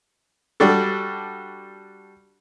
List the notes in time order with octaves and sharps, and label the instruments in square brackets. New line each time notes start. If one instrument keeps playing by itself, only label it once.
[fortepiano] G3 D4 F#4 A4